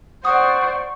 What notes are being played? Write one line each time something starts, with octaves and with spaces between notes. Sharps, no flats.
C5 D5 F#5 C#6 D#6